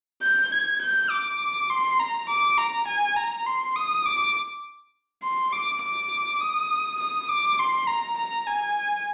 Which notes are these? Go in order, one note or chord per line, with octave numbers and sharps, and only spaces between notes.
G6
G#6
G6
D6
C6
A#5
D6
A#5
G#5
A#5
C6
D#6
D6
C6
D6
D6
D#6
D#6
D6
C6
A#5
A#5
G#5